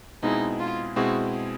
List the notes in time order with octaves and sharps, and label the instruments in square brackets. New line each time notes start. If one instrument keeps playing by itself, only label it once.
[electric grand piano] B2 G#3 C4 E4 G#4 [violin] D#4
[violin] F4
[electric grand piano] B2 G#3 C4 E4 G#4 [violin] F#4